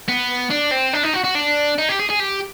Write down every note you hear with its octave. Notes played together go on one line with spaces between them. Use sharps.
B3
D4
C4
D4
D#4
F#4
F#4
D4
D#4
G4
G#4
G#4
G4